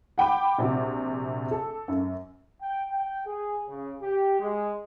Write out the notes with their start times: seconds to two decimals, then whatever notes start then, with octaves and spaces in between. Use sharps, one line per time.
0.18 F#5 G5 B5 D6
0.58 A#1 C3 F#4
1.51 A4
1.88 F#2
2.61 G5
2.91 G5
3.27 G#4
3.69 C#3
4.02 G4
4.40 G#3